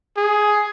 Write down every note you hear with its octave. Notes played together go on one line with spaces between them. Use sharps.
G#4